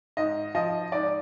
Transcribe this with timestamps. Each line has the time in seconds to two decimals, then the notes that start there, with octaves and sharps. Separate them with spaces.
0.17 G#2 D#5
0.55 F3 D#5
0.92 G#2 D5